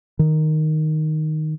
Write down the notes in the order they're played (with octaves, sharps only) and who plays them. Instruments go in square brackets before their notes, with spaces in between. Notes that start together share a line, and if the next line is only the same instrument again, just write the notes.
[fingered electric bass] D#3